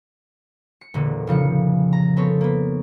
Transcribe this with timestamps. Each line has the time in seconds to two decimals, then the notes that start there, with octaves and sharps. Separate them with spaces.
0.81 C#7
0.94 E1 A#2 D3 A#3
1.27 F1 C#3 F3 C#7
1.93 A#5
2.16 B3 C4 A4 C#5
2.41 A#3 B3